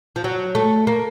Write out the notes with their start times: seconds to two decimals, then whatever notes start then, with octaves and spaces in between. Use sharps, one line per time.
0.16 F3
0.24 F#3
0.55 A3
0.87 A#3